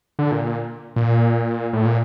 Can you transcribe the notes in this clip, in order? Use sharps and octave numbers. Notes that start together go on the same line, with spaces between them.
D3
A#2
A#2
A#2
A2
A#2